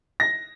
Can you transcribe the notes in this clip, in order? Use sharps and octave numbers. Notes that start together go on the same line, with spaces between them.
A#6